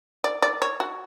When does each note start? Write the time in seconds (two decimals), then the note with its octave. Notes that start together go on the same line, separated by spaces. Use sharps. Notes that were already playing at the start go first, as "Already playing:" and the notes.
0.24 D5
0.42 D5
0.62 C#5
0.80 F#4